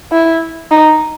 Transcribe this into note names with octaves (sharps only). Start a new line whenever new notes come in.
E4
D#4